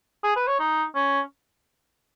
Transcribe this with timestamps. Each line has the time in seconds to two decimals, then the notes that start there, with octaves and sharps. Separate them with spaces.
0.24 G#4
0.36 B4
0.48 C#5
0.59 D#4
0.95 C#4